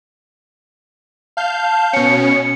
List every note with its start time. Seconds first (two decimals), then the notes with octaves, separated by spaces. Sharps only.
1.37 F5 A5 G6
1.93 B2 C#4 C#7